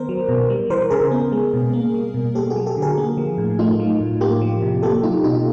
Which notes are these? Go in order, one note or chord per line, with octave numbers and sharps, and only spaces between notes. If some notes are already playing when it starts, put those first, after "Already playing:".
Already playing: D#3 B3 A#4 C5
F#3
B2
G3
E3 A#4 C5
C#3 G#4 A#4
B3
G#3
B2
A#3
G3
B2
A#3 G4 A4
F#4 G#4
F#3
G4 A4
D3
G#4 A#4
A#3
F3
A2
A3 D#4 F4
F#3
A2
A#3 F4 G4
F3
C3
A#3 G4 A4
F#3 D#4 F4
B2 D#4 F4